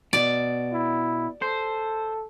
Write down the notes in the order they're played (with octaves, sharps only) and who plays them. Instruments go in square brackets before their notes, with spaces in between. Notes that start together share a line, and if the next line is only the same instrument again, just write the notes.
[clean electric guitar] B2 [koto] D5
[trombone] E4
[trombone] A4 [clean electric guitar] C5